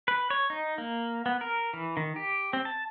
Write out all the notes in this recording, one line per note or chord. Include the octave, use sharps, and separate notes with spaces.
B4
C#5
D#4
A#3
B3
A#4
E3
D#3
G4
C4
A5